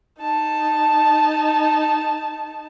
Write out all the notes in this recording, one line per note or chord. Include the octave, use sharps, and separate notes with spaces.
D#4 A5